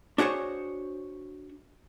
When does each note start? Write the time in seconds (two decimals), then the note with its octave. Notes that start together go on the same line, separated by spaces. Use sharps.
0.18 D4 F#4 G#4 C5 C#5